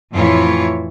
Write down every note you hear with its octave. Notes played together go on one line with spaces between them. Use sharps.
F2 A2 E3 E4 F4 C#5